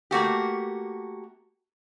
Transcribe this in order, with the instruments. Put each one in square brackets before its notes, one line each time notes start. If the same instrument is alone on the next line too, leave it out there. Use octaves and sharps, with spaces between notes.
[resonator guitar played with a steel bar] A3 A#3 F#4 G4